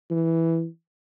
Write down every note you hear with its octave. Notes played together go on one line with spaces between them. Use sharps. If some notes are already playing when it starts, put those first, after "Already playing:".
E3